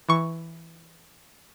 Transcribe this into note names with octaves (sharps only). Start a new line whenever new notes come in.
E3 C#6